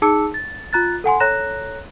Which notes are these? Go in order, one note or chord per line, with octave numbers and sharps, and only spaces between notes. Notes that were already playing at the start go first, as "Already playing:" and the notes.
D#4 G#4 A5 D6 E6 C#7
A6
F4 A#5 F#6 A6
A4 F#5 G#5 C6
A4 C#5 A#5 F#6 A#6 E7